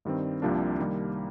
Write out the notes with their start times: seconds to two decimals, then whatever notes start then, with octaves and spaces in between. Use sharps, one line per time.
0.05 G2 D#3 G3 C4
0.42 C2 C3 F3 A#3 D4
0.79 D#3 G3 A#3